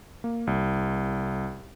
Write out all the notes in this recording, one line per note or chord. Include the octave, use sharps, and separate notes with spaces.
A#3
C2